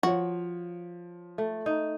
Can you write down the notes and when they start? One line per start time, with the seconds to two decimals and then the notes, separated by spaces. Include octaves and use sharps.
0.03 F3 F#4 C#5
1.38 A3
1.66 D#4